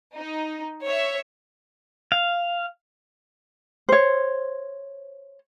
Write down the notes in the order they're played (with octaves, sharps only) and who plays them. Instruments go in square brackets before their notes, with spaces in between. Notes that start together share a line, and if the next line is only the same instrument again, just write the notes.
[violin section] D#4
C#5 E5
[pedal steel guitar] F5
[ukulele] C5 C#5